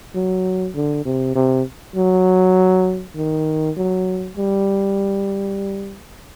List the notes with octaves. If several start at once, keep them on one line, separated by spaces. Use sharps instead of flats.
F#3
D3
C3
C3
F#3
D#3
F#3
G3